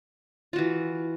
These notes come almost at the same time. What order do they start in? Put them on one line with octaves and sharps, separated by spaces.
F4 F#4 E3